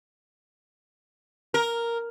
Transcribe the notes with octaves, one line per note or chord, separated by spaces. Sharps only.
A#4